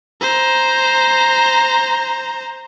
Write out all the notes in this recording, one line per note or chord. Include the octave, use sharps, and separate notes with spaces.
C5 A#5